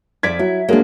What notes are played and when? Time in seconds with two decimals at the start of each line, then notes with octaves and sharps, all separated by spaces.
0.23 F2 F3 D5 G#6 B6
0.39 F#3 E4
0.68 F#3 G#3 A#3 D4